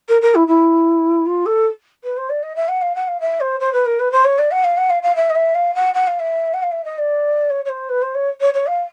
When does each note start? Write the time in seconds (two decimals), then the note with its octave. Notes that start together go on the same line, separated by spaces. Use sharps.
0.08 A#4
0.21 A#4
0.34 E4
0.47 E4
1.25 F4
1.45 A4
2.03 B4
2.16 C5
2.29 D5
2.42 D#5
2.55 E5
2.68 F#5
2.81 F5
2.95 F#5
3.07 F5
3.20 E5
3.40 C5
3.59 C5
3.72 B4
3.85 A#4
3.99 B4
4.11 C5
4.24 C#5
4.38 D5
4.51 F#5
4.63 F5
4.77 F#5
4.89 F5
5.02 F5
5.15 E5
5.30 D#5
5.35 E5
5.54 F5
5.74 F#5
5.94 F#5
6.07 F5
6.19 E5
6.53 F#5
6.62 F5
6.71 E5
6.84 D#5
6.98 D5
7.50 C#5
7.64 C#5
7.69 C5
7.89 B4
8.01 C5
8.14 C#5
8.40 C#5
8.53 C#5
8.66 F5